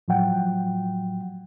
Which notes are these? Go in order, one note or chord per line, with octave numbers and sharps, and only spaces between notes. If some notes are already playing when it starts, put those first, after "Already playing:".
A2 F3 F#3 F#5 G5